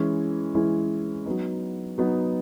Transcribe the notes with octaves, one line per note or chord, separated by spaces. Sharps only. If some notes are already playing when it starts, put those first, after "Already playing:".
Already playing: E3 G#3 C#4 E4
E3 G#3 C#4 E4
F#3 B3 D#4
F#3 B3 D#4